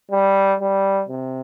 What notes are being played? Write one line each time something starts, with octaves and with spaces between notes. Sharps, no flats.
G3
G3
C3